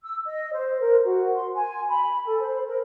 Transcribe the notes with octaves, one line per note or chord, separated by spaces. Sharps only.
E6
D#5
C5
A#4
F#4
C6
G#5
B5
A4
C5
A#4